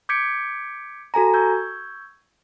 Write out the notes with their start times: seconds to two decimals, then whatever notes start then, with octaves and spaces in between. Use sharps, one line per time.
0.09 D6 G6 G#6 B6 C#7 D7
1.14 F#4 A4 G#5 A#5
1.34 C#6 E6 G6 G#6